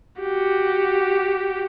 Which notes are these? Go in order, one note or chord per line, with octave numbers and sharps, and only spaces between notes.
F#4 G4